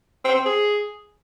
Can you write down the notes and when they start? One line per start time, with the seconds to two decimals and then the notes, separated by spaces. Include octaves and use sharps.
0.25 C4
0.35 C4
0.46 G#4